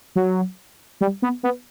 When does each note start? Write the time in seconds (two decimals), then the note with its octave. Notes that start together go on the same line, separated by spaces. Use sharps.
0.16 F#3
1.01 G3
1.22 B3
1.43 B3